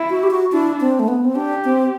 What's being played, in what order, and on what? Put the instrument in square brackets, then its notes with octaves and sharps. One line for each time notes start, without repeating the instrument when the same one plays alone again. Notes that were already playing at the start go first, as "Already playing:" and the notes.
Already playing: [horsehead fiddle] E4
[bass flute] F#4
G4
F#4
[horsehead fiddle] D4 [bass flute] E4
[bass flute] C4
A3
B3
C4
[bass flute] D4 [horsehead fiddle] G4
[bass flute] C4